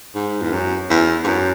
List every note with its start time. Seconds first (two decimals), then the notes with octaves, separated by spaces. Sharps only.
0.15 G#2
0.42 E2
0.52 F#2
0.90 E2
1.24 G#2
1.28 F#2